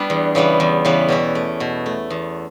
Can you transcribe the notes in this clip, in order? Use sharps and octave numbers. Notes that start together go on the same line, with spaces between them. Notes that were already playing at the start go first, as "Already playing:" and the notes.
Already playing: G3 B3 D4 E4
E2
C#3 E3 G3 B3
E2
C#3 E3 G3 B3
B2 C#4 E4
A3
B2
A3
E2